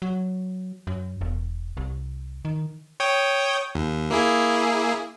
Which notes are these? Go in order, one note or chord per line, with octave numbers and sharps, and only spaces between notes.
F#3
F#2
E1
C2
D#3
C#5 G5 D#6
D#2
A#3 E4 G#4